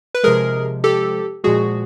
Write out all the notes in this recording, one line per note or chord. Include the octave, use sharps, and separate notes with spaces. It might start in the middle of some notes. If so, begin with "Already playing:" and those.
B4
C3 F3 G#3 G#4 A#4
G4 A4
A#2 F3 G#3 F#4 G#4